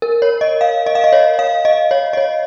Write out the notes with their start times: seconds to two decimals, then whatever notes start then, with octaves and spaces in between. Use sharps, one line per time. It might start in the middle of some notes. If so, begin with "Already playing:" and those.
0.02 A#4
0.22 C#5
0.41 D#5
0.61 F5
0.86 D#5
0.95 F5
1.04 D#5
1.13 C#5
1.39 F5
1.65 D#5
1.91 C#5
2.13 D#5
2.17 C#5